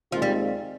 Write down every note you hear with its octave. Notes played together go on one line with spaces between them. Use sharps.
D#2 D#3 F3 G#3 C4 F4
G3